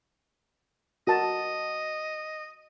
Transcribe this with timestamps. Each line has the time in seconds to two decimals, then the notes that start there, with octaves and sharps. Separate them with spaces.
1.07 F#4 A#4 D#5 A5